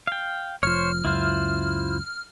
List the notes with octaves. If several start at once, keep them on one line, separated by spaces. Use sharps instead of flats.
F5 G5
F1 F3 C5 C#5 F6
C#2 F#2 E4 F4 C5